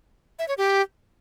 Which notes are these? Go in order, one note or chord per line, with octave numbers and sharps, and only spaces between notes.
E5
C#5
G4